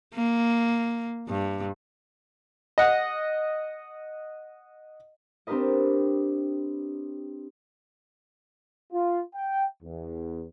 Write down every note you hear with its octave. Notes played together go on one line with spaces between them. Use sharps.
A#3
G2
D#5 F#5
C4 D4 G4 A#4 B4 D#5
F4
G5
E2